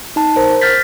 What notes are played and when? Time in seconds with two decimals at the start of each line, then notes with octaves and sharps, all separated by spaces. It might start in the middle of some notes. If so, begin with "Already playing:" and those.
0.16 D#4 A5
0.36 A#4 C5
0.61 F6 G6 A6 B6